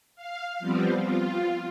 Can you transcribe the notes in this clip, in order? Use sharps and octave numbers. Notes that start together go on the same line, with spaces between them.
F5
F3 G3 B3 C4
F4